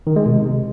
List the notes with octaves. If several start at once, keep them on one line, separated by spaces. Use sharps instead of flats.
D#3
G#3
B2
C3